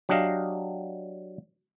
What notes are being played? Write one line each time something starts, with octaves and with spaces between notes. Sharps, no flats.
F#3 D4 G4 D#5 F5